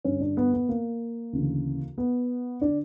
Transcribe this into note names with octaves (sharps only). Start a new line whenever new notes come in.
G2 C#4
D3
D4
B3
B3
A#3
D2 C#3 E3
B3
D3 D4